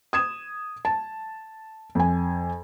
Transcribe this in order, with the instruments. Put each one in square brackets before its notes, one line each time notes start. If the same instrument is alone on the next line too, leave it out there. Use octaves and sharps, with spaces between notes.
[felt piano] D#6 G#6 E7
A5
F2 G#5